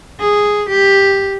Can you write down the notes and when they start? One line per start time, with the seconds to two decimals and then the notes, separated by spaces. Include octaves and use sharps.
0.20 G#4
0.70 G4